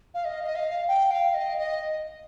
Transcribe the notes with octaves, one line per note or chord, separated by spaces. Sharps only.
F5
D#5
D#5
F5
G5
F5
D#5
D#5